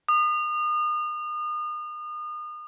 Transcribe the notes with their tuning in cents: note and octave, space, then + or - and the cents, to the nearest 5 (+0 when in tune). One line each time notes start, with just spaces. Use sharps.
D#6 -35